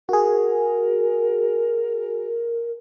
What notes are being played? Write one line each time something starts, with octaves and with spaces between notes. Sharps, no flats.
F#4 G#4 A#4